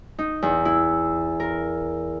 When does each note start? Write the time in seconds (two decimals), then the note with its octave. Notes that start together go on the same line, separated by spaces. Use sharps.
0.19 D#4
0.42 E2
0.65 E4
1.40 A#4